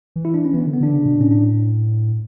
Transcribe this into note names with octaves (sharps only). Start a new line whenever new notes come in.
E3
E4
D4
C#4
E3 B3
D3
B3
D3 D4
C#3
B2
A2 C#4
D4